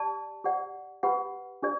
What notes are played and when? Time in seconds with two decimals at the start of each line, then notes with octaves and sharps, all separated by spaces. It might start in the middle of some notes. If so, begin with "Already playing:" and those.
Already playing: G4 D5 A5
0.44 G4 D5 F#5
1.03 G4 B4 F#5 B5
1.62 D4 G4 D5